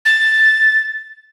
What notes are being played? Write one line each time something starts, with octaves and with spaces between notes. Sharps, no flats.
A6